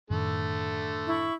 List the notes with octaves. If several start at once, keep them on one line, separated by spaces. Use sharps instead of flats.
F#2 A2 D3 D#3 A3
E4 C#6